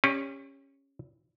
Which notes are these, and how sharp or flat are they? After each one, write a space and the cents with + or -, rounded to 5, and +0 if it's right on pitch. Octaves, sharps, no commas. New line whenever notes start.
C#4 -10 G4 +35 D5 +0